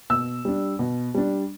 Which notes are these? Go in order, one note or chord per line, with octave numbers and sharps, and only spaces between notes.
B2 E6
G3 D4
B2
G3 D4